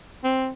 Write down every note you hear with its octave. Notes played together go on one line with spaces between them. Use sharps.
C4